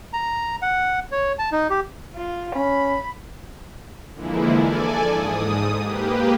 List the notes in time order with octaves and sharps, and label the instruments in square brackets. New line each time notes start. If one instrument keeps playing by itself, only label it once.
[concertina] A#5
F#5
C#5
A5
D#4
G4
[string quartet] F4
[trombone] C#4 [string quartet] B5
[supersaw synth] D3 E3 F3 G#3 A#3 E4
A4 D5 G#5
G#2 D#6
A#3 G4 B4